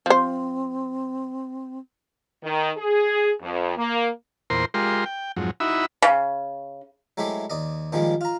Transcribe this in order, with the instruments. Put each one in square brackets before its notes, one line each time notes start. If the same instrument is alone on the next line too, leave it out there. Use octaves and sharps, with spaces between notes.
[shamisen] F3 C5 [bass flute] C4
[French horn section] D#3
G#4
F2
A#3
[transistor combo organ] E2 A#2 A#4 C5 C6
G#3 F4 G4 A#4 C6
G5
F2 G#2 F#3
D#4 E4 F#4 E5 B5
[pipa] C#3
[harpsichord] F#3 G#3 A3 E4 G4 C5
D#2 D5 D#5
A#2 D#3 F3 G3 G#3
F4 A#5